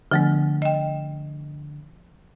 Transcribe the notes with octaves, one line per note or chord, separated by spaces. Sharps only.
D3 F3 A3 B3
D#5 G5